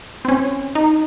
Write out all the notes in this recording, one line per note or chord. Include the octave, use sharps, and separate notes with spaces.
C4
C#4
D#4